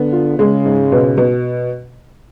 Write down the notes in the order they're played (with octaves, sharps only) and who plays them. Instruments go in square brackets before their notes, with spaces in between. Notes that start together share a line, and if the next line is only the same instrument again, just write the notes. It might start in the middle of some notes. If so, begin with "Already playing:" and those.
Already playing: [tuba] D3 [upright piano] B3
[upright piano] F4
[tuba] C#3 [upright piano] G#3
[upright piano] G#2
B2
B2